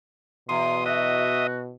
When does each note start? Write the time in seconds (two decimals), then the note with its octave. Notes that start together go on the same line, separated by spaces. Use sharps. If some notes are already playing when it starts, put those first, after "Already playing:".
0.49 E2 B2 C6 D#6
0.86 F#4 D#5 E5 D#6